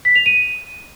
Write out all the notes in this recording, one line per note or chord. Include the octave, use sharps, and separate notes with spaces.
B6
F7
D#7